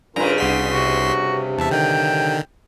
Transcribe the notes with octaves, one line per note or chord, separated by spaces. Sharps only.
G2 C#3 C#4 F4 A#4 A#5
C2 F#4 C6 B6
C3 F#4
E2 E5 A5
D3 D#3 G5